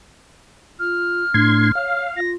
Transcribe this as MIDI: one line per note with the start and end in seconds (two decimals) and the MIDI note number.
0.79 1.24 65
0.79 2.03 89
1.34 1.72 45
1.34 1.70 62
1.34 1.72 84
1.34 1.72 92
1.75 2.06 73
1.75 2.20 77
2.17 2.35 65
2.17 2.31 94